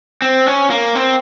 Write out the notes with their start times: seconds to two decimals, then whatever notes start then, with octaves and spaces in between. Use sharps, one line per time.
0.22 C4
0.47 C#4
0.70 A#3
0.95 C4